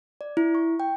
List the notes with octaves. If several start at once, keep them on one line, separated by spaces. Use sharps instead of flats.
D5
E4
C#6
G5